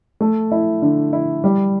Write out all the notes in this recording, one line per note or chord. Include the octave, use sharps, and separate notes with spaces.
A3
E4
D3
E4
G3